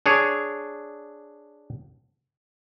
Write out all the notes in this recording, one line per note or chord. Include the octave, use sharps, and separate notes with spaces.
D4 G#4 C#5